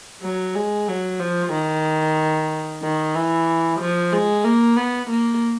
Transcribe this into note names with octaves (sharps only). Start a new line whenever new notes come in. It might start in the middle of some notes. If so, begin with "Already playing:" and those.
F#3
G#3
F#3
F3
D#3
D#3
E3
F3
G#3
A#3
B3
A#3